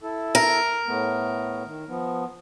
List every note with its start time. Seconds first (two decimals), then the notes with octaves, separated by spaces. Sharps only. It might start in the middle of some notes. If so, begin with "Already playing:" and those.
0.03 E4 A4
0.35 A#4
0.87 A2 A3 B3
1.64 D#3
1.88 F3 B3